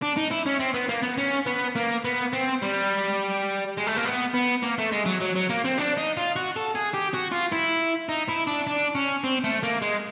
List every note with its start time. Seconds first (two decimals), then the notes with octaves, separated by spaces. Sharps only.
0.02 D4
0.17 D#4
0.31 E4
0.46 C#4
0.60 C4
0.74 B3
0.89 A#3
1.03 B3
1.18 C#4
1.46 B3
1.76 A#3
2.05 B3
2.33 C4
2.62 G3
3.78 G#3
3.87 A3
3.97 A#3
4.05 B3
4.34 B3
4.63 A#3
4.79 A3
4.92 G#3
5.06 F#3
5.21 F#3
5.36 F#3
5.50 A#3
5.65 C4
5.78 D4
5.98 D#4
6.17 F4
6.36 F#4
6.56 A4
6.75 G#4
6.94 G4
7.14 F#4
7.32 F4
7.52 E4
8.09 D#4
8.29 E4
8.47 D4
8.67 D4
8.95 C#4
9.24 C4
9.44 A3
9.63 A#3
9.82 G#3